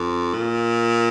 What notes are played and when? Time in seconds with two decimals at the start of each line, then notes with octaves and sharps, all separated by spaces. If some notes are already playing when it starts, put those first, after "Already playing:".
Already playing: F2
0.34 A#2